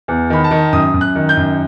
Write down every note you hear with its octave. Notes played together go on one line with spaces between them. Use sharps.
E2
D#3 B5
A5
D#3
F#2 D#6
F#2
F#6
D#3
G6
F#2